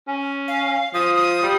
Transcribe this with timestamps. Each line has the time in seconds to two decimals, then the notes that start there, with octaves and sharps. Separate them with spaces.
0.08 C#4
0.48 F5
0.94 F3 D#6
1.16 D#6
1.43 G3